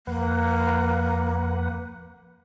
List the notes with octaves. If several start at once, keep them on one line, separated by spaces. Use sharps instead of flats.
F2 A#3 B4 F#5